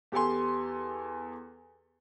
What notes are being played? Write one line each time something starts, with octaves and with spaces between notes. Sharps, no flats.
E2 G4 A4 G#5 C6